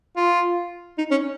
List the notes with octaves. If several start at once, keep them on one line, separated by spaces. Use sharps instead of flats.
F4
D#4
C#4